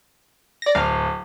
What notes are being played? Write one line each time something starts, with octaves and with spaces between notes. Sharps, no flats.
D5 A#6
D1 F5